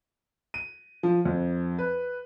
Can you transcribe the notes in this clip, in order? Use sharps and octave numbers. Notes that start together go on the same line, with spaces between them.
D#7
F3
F2
B4